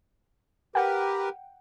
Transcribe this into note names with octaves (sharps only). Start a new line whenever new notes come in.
G4 A#4 B4 F#5 G5